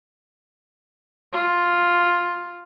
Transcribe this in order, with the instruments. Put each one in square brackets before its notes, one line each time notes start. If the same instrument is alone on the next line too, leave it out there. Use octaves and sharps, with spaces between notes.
[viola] F4